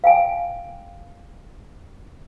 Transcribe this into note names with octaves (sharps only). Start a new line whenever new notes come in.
F5 G5 G#5